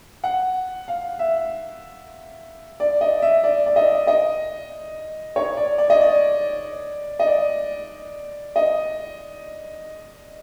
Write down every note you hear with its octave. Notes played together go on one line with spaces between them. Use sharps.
F#5
F5
E5
D5
D#5
E5
D5
D5
D#5
D#5
C#5
D5
D5
D#5
D5
D#5
D5
D#5